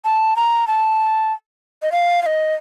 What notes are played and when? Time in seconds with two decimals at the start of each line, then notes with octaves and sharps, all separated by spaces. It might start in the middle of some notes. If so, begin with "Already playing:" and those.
0.05 A5
0.36 A#5
0.67 A5
1.82 D#5
1.92 F5
2.23 F5
2.26 D#5